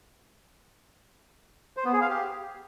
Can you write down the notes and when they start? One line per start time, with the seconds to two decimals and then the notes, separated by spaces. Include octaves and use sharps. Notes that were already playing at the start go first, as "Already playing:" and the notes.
1.77 C5
1.85 B3
1.93 G#4
2.01 F5
2.09 G4